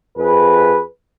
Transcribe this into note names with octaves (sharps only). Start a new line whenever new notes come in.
F2 G#4 B4